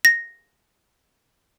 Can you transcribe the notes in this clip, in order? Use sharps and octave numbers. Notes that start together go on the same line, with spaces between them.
A#6